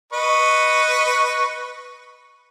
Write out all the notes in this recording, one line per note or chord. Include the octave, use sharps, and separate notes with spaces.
B4 D#5 C#6